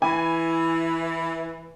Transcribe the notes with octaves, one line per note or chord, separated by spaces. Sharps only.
E3 G#5 B5